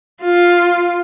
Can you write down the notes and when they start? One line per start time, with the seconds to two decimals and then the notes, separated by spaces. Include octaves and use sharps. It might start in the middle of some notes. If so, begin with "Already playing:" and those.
0.22 F4